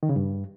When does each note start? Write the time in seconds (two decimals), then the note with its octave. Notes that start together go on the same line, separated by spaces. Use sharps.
0.03 D#3
0.09 C#3
0.16 G2